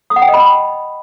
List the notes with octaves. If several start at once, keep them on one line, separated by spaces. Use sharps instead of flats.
D#6
F#5
G5
D#5
B5